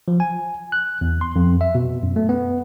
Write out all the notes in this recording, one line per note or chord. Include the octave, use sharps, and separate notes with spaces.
F3
G#5
F#6
E2
C6
F2
E5
B2
F#2
A3
B3